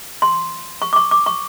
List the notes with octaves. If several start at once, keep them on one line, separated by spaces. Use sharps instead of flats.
C6
C#6
D6
C#6
D6
C#6